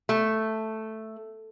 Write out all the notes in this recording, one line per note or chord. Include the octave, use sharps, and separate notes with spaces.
A3